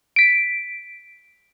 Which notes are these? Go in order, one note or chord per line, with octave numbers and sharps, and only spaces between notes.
B6 D7